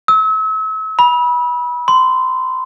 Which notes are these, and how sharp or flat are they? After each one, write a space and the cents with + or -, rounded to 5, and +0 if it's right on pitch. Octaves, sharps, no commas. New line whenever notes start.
E6 -35
B5 -25
C6 -20